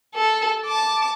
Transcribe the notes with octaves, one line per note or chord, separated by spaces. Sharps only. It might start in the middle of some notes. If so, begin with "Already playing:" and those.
A4
A5 D6